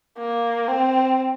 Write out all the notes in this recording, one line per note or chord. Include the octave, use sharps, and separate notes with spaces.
A#3
C4